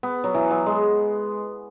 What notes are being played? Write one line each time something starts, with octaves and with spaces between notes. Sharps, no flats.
B3
F#3
E3
F#3
G#3